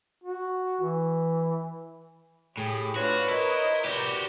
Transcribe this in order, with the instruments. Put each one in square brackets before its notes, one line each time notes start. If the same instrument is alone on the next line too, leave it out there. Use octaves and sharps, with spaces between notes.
[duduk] F#4
E3
[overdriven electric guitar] A2 [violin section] G4 [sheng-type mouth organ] G#4
[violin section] D4 F4 F6 [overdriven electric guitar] F#4 [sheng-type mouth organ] B4 C#5
[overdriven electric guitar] E4 [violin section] A#4 C5 D#5
[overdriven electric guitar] F#4 G4 [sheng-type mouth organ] B4 [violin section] D5 G6